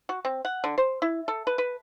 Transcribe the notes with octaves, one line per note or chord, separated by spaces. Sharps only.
F#4
C4
F#5
D3
C5
E4
A4
B4
B4